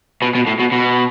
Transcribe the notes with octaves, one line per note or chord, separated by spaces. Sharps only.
B2
B2
A2
B2
B2